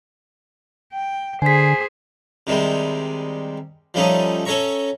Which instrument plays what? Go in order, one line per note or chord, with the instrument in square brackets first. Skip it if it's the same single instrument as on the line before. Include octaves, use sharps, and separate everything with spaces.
[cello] G5
[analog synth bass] D3 [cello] G#4 C5 [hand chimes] G#5 B6
[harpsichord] C3 D#3 G3 G#3
F3 G3 A3 C#4 D#4
C#4 A4 C#5 E5 A#5 C#6